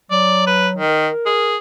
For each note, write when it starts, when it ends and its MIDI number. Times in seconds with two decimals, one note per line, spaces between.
0.11 0.80 54
0.11 0.43 74
0.47 0.68 71
0.75 1.08 51
0.88 1.56 70
1.26 1.57 68